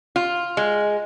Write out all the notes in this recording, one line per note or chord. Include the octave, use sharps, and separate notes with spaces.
F4
G#3